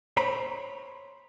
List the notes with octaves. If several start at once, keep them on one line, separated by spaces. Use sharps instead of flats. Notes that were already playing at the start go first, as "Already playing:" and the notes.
C5 C#5 A#5 B5